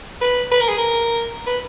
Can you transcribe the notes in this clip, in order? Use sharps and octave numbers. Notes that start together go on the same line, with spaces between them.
B4
B4
A#4
G#4
A#4
B4